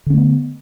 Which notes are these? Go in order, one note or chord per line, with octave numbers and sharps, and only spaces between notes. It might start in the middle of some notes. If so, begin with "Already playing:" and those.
D3 A3 B3 C#4